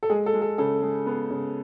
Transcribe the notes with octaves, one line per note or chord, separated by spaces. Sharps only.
A4
G#3 G#4
A4
G#3
A4
C#3 A4
G#3
B3
C#3